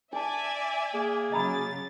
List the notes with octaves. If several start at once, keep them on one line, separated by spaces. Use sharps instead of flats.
D4 D5 E5 G#5 A5
A#3 G#4
C#3 F#3 D#5 A#5 B5 A6